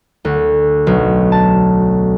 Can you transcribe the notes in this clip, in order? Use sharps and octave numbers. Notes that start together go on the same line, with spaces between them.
D2
B1
A5